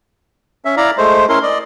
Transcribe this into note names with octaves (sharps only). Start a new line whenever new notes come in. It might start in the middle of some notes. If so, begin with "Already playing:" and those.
C#4 E5
E4 D5 F5 A#5
G#3 A3 C5
C#4 E4 A#4 C6
D5 D#5